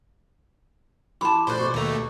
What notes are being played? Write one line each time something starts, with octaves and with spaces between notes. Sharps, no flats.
E3 G4 A5 B5 C6 D6
A#1 A3 C5 D5 D6 F#6
B2 C#6
D#2 A3 D5 A#5